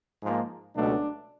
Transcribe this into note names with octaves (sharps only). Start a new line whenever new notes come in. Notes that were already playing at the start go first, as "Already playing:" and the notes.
G#2 F3 A#3
C#2 B2 F#3 A3 D4